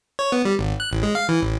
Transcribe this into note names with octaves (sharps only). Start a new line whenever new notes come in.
C#5
B3
G3
G#1
F#6
A1
G#3
F5
E3
A1